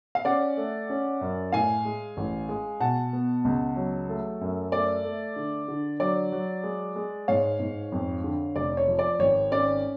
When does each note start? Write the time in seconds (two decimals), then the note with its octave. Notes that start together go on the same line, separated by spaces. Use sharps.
0.15 F5
0.25 C#4 D5 F#5
0.57 A3
0.90 C#4
1.21 F#2
1.52 A2 F5 G#5
1.85 G#3
2.17 A1
2.49 G#3
2.80 B2 F#5 A5
3.13 B3
3.45 C#2
3.76 F#3
4.09 A3
4.41 F#2
4.72 A3 D5
5.05 A3
5.36 D3
5.68 D3
6.00 F#3 D5
6.32 F#3
6.63 G#3
6.96 G#3
7.28 G#2 C#5 F5
7.60 G#2
7.92 F2
8.24 D3
8.56 F1 D5
8.77 C#5
8.87 F3
8.99 D5
9.19 G#1 C#5
9.51 C#4 D5